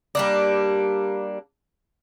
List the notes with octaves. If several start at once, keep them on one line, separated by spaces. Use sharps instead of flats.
G3 A#3 D4